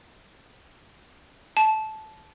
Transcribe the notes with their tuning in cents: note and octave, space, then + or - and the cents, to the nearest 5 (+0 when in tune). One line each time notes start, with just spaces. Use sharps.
A5 -15